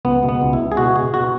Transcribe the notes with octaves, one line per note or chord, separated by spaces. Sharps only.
C#2 B3
B2
B3
C#2
E4
C#2
G#4
B2 F#4
B2 G#4
B2 F#4